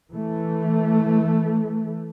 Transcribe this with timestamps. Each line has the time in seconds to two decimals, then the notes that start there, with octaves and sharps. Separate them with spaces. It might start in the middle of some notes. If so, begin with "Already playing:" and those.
0.11 E3 A3